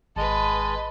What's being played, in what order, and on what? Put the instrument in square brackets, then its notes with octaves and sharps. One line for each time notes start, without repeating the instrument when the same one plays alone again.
[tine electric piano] G#1 [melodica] G#3 A5 [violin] B4 D#5